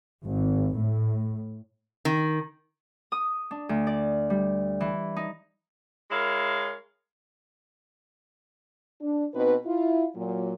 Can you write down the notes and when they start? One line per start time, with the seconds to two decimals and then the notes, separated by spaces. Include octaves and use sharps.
0.25 G#1
0.77 A2
2.05 D#3
3.12 D#6
3.51 D4
3.69 D2
3.87 D5
4.30 G3
4.80 E3
5.16 D#4
6.11 G#3 E4 A#4 C#5 F5
9.02 D4
9.34 B2 C4 D#4 B4
9.65 E4 F4
10.16 A#2 F#3